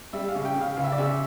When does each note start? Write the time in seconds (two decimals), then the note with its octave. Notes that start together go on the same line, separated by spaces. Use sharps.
0.13 G3 E5
0.29 F5
0.35 C#3
0.45 G5
0.56 C#3
0.61 F5
0.77 C#2 F5
0.84 E5
0.92 D5
0.98 C#3 E5